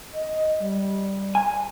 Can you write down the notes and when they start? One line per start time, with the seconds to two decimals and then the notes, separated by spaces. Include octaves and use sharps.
0.14 D#5
0.60 G3
1.35 G#5